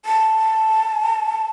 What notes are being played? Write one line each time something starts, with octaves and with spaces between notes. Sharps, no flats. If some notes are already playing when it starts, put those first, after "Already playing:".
A5